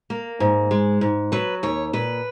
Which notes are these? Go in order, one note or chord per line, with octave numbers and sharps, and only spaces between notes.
A#3
G#2
G#3
G#2
F#3 B4
D#2 C#5
A#2 B4